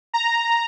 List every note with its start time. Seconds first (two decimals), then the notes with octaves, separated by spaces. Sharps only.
0.14 A#5